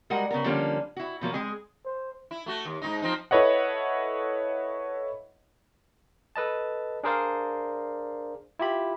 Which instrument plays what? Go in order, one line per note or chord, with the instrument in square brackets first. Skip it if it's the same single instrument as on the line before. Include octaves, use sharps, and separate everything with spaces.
[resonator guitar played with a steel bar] G3 G#3 F#4 A#4 F#5
C#3 B3 A#4
D3 F3 G3 A#3 C#4
E4 F#4
B2 F3 F#3 A#3
G#3 C4 G#4 D#5 G#5
[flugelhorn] C5
[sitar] E4
A3 F#4
D#2
G#2 B2 D#4
F3 C4 D#4
[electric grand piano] E4 A4 B4 C#5 D#5 F#5
[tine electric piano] A4 B4 D#5 A5
D4 G#4 A#4 C5 D5 F5
E4 F4 G4 B5